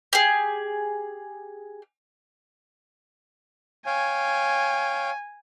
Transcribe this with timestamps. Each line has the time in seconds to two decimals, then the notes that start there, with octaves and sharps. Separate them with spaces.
0.13 G4 G#4
3.86 C#5 F5 G5 G#5